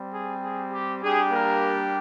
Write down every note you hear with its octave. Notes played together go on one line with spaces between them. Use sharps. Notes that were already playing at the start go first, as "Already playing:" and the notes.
Already playing: G3 C4 G4
G#4
G#4
G4
G3 D4 G4 G#4
A#3 A#4